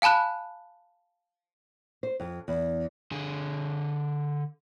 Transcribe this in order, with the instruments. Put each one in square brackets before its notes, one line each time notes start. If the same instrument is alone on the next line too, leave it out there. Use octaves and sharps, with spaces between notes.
[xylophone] F5 G#5 A5 B5 F#6
[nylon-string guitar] C5
F2
E2
[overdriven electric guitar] D3 G#4